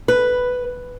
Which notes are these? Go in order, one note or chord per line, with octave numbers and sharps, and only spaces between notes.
B4